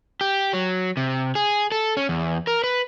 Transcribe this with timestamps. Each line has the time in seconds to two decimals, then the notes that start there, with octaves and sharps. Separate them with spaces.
0.21 G4
0.53 F#3
0.97 C3
1.35 G#4
1.72 A4
1.97 C#4
2.09 E2
2.47 A#4
2.64 B4